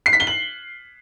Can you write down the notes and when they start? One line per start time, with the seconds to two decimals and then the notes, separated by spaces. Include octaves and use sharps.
0.06 C7
0.13 B6
0.20 G7
0.27 F#7